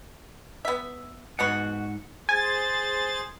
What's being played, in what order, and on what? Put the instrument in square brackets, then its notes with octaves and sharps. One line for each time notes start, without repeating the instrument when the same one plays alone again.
[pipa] B3 E5
[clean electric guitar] G#2 F#5 [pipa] B2 B3 F#4
[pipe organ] G#4 C5 A6 [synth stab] G#5